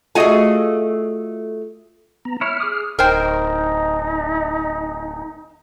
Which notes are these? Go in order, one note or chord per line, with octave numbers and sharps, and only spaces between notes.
A3 F4 F#4 G#4 D#5 G#5
B3 A#5
E4 C#5 F6
G#4 D6 D#6
D1 D#4 A#4 C5 G5